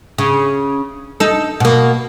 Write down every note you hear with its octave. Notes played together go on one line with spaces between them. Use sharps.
C#3
D#4 A4
B2 A#3